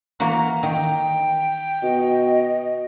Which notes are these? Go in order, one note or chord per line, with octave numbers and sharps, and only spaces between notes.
E3 A#3 F#4 A#5
D#3 G5
B2 D#5